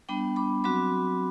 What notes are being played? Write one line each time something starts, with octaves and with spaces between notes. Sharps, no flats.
G3 B3 D4 G5 B5
B5 D6
F#3 C4 F#4 B5 D6